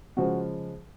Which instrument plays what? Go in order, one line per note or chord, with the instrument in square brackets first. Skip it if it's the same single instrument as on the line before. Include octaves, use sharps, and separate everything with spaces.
[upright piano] C#3 F3 G#3 F#4